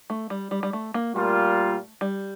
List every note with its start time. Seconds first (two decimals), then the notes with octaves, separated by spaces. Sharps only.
0.10 A3
0.30 G3
0.51 G3
0.63 G3
0.73 A3
0.94 A#3
1.15 A#2 G3 A3 A#3 F4
2.01 G3